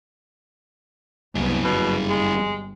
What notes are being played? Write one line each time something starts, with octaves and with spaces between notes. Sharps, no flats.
C2 F#2 B3 G#4
G1 B2 G3
G#3